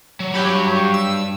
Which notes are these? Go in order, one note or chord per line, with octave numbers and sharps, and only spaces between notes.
F#3
G2 F#3 G4 C#5 B5
E6